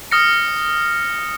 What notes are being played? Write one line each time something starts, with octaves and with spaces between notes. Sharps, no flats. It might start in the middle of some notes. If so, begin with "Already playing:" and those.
D#6 F6 A#6 C#7